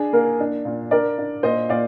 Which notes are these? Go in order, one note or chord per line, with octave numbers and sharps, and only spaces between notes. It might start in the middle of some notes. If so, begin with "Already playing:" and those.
Already playing: D4 G#4
A#3 A#4
D4
A#2
D4 A#4 D5
D4
A#2 C5 D#5
A#2 D5 F5